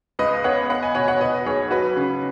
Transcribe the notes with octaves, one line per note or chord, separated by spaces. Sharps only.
C#2 B4 D#5
B3 C#5 F#5
B3 F#5 B5
D#5 G#5
B2 C#5 F#5
C#5 F#5
B2 B4 D#5
B1 G#4 C#5
F#3 F#4 B4
C#3